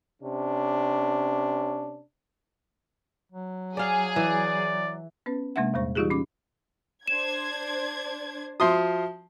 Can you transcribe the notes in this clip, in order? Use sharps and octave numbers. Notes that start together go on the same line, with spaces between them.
C3 C#4 D4
F#3
G#4 D5 F5
E3 D5
B3 C#4 B4
C3 G#3 A#3 D4 E5 F#5
E2 A#2 G3 C5 C#6
E3 G3 D#4 F4 G4 G#4
C#4 D6
D4 C5 G#6 E7
F3 F#4 E5 C6 D#6